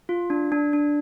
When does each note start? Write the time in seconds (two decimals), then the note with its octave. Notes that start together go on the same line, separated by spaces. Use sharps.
0.09 F4
0.30 D4
0.52 D4
0.73 D4